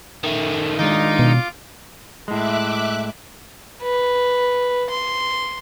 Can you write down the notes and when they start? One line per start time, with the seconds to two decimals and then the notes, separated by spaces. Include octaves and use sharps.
0.24 D#3 A3
0.79 D#3 G#3 D4 D#4 F4 D6
1.19 B2
2.28 A2 G#3 E5 D6 F#6
3.83 B4
4.91 C6